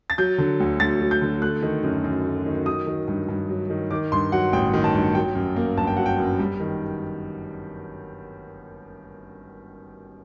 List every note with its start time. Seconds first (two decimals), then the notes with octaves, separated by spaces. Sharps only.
0.10 A6
0.18 F#3 G6
0.38 D3
0.60 D2
0.80 D2 A6
1.00 F#3
1.11 G6
1.21 D3
1.42 A3 F#6
1.62 D#3
1.83 F#2
2.04 F#2
2.25 A3
2.46 D#3
2.66 F#3 D#6
2.87 D#3
3.08 G2
3.28 G2
3.49 F#3
3.70 D#3
3.91 D#3 D6
4.12 G2 C6
4.32 F#3 F#5
4.53 A1 G5
4.74 D#3
4.84 A5
4.94 G2
5.15 F#3 G5
5.35 F#2
5.56 A#3
5.77 G1 A5
5.87 G5
5.97 F#3 F#5
6.06 G5
6.18 F#2
6.39 G3
6.60 D#3